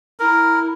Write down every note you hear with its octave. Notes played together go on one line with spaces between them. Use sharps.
E4 A#4